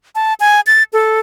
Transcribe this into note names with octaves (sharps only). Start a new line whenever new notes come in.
A5
G#5
A6
A4